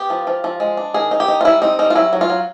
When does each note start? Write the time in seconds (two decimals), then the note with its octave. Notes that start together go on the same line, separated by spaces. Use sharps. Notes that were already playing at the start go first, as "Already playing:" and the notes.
Already playing: B3 G4
0.10 F3
0.27 F3
0.44 F3
0.60 G#3
0.77 D4
0.94 D#3 G#4
1.11 D#4
1.20 G4
1.28 D#4
1.41 F4
1.45 G3 E4
1.62 C4 D#4
1.79 G3 D#4
1.90 F4
1.95 F#3 E4
2.13 F#3
2.21 F4
2.30 F#3